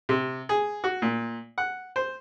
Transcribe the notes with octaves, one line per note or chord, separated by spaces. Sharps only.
C3
G#4
F#4
A#2
F#5
C5